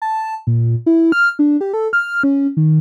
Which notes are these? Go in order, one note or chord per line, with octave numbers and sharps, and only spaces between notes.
A5
A#2
E4
F6
D4
G4
A4
F6
C#4
D#3